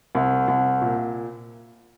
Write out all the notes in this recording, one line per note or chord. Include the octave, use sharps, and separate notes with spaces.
C2
C2
A#2